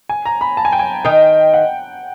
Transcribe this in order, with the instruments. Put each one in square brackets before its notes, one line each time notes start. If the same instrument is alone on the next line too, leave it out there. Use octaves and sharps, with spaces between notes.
[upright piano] G#5
A#5
B5
A5
G#5
G5
G#5
[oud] D#3 D#4 [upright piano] G5
[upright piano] F#5